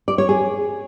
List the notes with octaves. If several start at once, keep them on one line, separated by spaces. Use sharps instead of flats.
D5
C#5
G#4